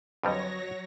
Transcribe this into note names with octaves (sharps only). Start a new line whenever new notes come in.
F2 D3 F#3 G3 B4 C#5 D#5 A#6